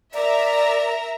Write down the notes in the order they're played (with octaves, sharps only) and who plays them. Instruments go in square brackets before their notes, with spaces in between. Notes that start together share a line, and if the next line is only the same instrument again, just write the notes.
[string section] A#4 E5 A#5 [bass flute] D5